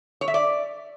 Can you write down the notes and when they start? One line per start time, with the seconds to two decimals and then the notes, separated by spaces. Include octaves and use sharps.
0.21 C#5
0.28 E5
0.34 D5